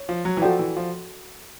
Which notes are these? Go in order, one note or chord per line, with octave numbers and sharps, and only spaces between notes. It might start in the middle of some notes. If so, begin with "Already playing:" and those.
Already playing: C#5
F3
F#3
E3
F3 F#4 A4 D5 G5
E3
F3